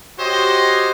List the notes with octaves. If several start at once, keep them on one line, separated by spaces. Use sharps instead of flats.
F#4 G4 C5 C#5 D#5